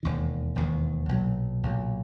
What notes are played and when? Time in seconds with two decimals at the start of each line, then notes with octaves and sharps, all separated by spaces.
0.03 E1 D#2 D#3
0.55 E1 D#2 D#3
1.09 B1 A#2 F#3
1.63 B1 A#2 F#3